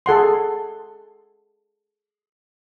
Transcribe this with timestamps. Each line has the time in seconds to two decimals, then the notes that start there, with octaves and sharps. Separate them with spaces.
0.06 G#4 A4 F#5 C6